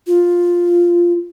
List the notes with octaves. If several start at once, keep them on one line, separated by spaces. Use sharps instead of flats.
F4